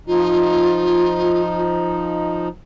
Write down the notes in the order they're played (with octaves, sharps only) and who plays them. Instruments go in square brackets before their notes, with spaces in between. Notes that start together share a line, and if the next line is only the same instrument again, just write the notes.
[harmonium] F3 D#4 [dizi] F4